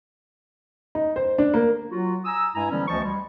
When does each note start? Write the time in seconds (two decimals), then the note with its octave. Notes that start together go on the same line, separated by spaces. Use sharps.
0.95 D#4
1.16 C5
1.38 D4
1.54 A#3
1.90 F#3 F4 F#4
2.25 G#5 A#5 D#6 E6
2.55 G2 G#3 E4 G#5 A#5
2.70 D3 E3 F3 G3 B3 C#4
2.88 D2 E3 F3 D#5 A5 C#6
3.04 G3 G#3